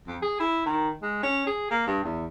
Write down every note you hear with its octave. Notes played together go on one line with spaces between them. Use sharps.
F2
G#4
E4
D#3
G#3
C#4
G#4
A#3
G2
E2